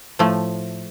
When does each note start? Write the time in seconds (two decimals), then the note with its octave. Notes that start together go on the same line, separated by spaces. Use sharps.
0.19 A2 F3 A3